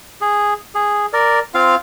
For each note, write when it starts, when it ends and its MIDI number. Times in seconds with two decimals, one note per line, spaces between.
0.21 0.54 68
0.75 1.06 68
1.13 1.39 70
1.13 1.39 74
1.54 1.75 60
1.54 1.75 65
1.54 1.75 77